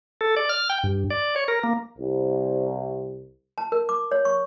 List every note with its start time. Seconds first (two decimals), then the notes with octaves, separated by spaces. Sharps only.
0.21 A4
0.37 D5
0.49 F6
0.70 G5
0.84 G2
1.10 D5
1.36 C#5
1.48 A#4
1.63 A#3
1.98 C2
3.58 A5
3.72 A#4
3.89 D6
4.11 C#5
4.25 C#6